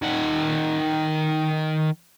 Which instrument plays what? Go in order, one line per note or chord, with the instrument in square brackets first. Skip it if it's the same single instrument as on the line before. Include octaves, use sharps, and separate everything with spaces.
[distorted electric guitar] D#3 F#5